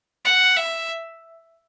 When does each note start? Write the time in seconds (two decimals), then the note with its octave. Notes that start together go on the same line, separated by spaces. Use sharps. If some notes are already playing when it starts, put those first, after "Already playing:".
0.25 F#5
0.57 E5